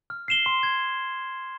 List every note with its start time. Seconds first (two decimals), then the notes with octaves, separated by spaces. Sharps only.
0.10 F6
0.28 C7 E7 G7
0.46 C6
0.63 G#6